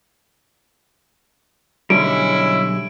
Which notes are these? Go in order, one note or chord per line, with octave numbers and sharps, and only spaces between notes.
B1 D3 G3 G#3 C#4 E4 D7